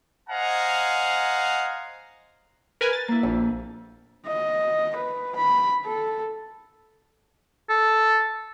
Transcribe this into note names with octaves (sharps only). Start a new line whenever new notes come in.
C5 D#5 F5 F#5 G#5 A#5
A#4 B4 G#5
A6
A#3 E4
A#1 F2
D#5
B4
B5
A4
A4